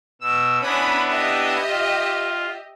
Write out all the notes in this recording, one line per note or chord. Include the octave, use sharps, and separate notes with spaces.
B2 E6
B3 C#4 D4 E4 B5 D#6
G4 D#5 E5
F4